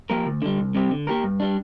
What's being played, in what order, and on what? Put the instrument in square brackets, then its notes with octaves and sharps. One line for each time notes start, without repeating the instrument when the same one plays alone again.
[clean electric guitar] F3 A#3 G4 A#4
D2
D3 G3
C2
C3 G3 C4 G4
D3
A#3 G4 A#4
G2
G3 D4